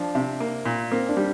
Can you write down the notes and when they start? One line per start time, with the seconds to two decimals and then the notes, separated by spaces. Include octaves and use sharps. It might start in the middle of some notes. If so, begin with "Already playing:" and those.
Already playing: F3 D4
0.15 C3
0.40 A#3
0.65 A#2
0.91 A#3 C4
1.09 D4
1.17 G3